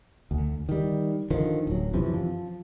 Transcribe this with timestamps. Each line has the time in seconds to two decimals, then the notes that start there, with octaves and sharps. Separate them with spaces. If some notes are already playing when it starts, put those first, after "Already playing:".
0.31 D2
0.69 D#3 G3
1.30 D3 D#3 F3
1.67 D1 F#3
1.94 F#2 C3 E3 F3
2.14 F3